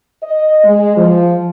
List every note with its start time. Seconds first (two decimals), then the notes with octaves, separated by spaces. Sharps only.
0.22 D#5
0.64 G#3
0.96 F3